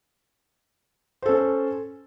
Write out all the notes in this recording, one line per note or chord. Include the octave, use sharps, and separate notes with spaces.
C#4 A4 C5